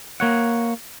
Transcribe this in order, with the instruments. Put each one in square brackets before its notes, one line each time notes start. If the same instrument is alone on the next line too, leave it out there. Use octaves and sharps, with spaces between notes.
[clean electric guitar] A#3 C#5 F#5